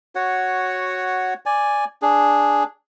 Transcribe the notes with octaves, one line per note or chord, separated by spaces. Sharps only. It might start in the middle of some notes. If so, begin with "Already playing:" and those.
F#4 C#5 F#5
D5 G#5
D4 G#4